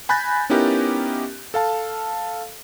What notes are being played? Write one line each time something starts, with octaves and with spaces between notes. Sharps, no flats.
G#5 B5 F#6 G6 A6 A#6
B3 C#4 D#4 E4 G4 A#4
A4 F5 A5